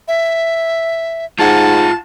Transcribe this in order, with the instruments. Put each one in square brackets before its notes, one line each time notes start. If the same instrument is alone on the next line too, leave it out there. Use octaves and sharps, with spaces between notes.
[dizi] E5
[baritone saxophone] G#2 [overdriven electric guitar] F4 F#5 [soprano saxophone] A5